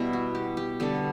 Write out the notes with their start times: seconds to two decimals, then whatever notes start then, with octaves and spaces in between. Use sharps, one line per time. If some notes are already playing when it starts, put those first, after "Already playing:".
Already playing: B2 G3 B3 E4
0.13 F#4
0.35 G4
0.57 G4
0.80 D3 G3 B3 A4